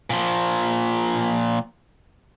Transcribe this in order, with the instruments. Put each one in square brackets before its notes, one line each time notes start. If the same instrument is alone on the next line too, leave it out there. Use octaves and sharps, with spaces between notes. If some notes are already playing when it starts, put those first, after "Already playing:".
[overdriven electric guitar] A#2 F3